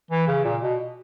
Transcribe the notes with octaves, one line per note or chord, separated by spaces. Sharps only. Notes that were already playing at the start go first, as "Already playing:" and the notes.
E3
C#3
A#2
B2